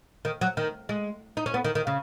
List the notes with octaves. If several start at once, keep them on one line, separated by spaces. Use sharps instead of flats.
D#3
F#3
D#3
G#3
D#4
C#4
B3
D#3
D#3
C#3